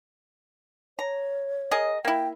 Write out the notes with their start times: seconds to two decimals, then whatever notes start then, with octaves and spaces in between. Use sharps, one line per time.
0.99 C#5 A#5
1.71 G#4 A#4 D#5
2.05 A#3 E4 G5